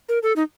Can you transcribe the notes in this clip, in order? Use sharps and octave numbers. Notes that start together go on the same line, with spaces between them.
A#4
A4
D#4